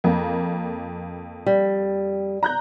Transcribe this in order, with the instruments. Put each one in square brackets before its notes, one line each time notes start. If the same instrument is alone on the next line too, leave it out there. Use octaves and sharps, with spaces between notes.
[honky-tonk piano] F2 A#3
[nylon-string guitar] G3
[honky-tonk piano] A#5 F#6 G6